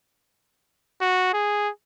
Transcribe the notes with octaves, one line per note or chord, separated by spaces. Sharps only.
F#4
G#4